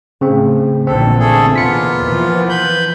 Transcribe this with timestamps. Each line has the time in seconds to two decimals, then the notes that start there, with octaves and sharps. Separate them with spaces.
0.21 A2 C#3 C4
0.87 A#1 E2 D3 C4 A4
1.19 A3 G#4 A4
1.56 E2 B2 A#3 B3 F4 B6 C#7
2.03 E3 F3
2.49 B4 B5 G6